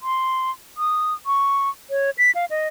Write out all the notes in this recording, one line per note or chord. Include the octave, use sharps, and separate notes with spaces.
C6
D#6
C#6
C#5
B6
F5
D#5